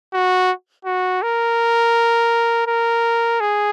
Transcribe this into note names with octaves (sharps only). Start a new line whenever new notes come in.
F#4
F#4
A#4
A#4
G#4